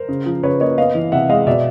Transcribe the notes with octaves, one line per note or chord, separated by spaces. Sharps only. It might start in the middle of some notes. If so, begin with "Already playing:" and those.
Already playing: A#4 C5
C#3
F3
C#3 B4 C#5
A#3 C#5 D#5
B3 D#5 F5
E3
C3 E5 F#5
G#3 D#5 F5
B2 D5 E5